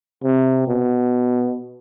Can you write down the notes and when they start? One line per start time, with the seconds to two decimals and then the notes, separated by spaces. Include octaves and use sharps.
0.24 C3
0.67 B2